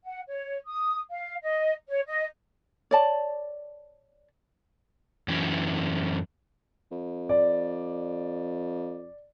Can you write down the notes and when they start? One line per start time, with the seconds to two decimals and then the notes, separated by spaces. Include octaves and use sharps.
0.05 F#5
0.28 C#5
0.66 D#6
1.10 F5
1.41 D#5
1.88 C#5
2.06 D#5
2.91 C#5 D5 A5
5.28 F#2 E3 C#4 E4
6.91 F2
7.29 D5